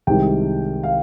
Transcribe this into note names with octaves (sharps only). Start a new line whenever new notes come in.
C2 C3 D#3 G#3 G5
F5